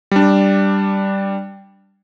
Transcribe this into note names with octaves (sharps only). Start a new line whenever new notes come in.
G3 D4